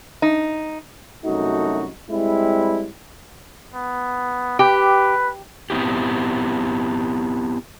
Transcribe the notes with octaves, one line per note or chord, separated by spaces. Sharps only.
D#4
C2 F#2 A3 D#4 F#4
G3 G#3 C4 E4
B3
G4 B4
B3 C4 E4 G4